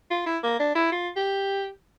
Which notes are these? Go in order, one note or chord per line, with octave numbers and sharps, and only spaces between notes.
F4
E4
A#3
D4
E4
F4
G4